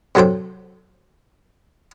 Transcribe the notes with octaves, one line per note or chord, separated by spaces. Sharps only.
C3 F#3 A4 C5 G5